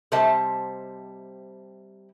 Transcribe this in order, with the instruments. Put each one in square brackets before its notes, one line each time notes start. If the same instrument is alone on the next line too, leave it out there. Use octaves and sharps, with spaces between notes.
[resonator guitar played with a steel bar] C3 G3 C5 D#5 E5 A5